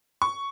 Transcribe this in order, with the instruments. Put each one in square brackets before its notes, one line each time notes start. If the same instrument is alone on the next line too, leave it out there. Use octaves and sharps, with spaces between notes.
[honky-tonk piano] C#6